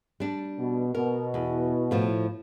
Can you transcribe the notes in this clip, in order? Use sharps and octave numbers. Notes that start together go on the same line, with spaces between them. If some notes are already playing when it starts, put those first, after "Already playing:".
G3 D4
B2
B2 A#4
E2
A2 F3